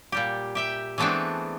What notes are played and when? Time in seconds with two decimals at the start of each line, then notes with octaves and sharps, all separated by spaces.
0.12 A#2 G3 G4
0.55 G4 E5 G5
0.98 E3 G#3 A3 B3 C4 D4